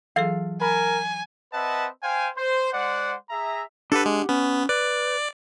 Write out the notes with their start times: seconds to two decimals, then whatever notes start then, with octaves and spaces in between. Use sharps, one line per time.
0.16 E3 F#3 F4 G#4 A4 F5
0.61 A#4 G#5 B5
1.53 C4 B4 D#5 E5 F#5 A5
2.03 C5 F5 G5 G#5
2.36 C5
2.73 G#3 C5 D5 F#5
3.30 G#4 E5 A#5
3.92 D4 G4 A4 B4 F#5
4.06 G#3
4.29 B3 C#4
4.69 B4 D5